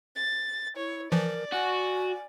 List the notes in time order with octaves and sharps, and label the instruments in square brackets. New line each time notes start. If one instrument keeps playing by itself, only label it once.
[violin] A6
[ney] E4 [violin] C#5
[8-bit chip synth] E3 F3 [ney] A#4 [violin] D5
[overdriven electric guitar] F#4 [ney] G#5